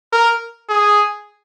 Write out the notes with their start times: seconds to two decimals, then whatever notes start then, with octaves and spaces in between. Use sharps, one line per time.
0.13 A#4
0.69 G#4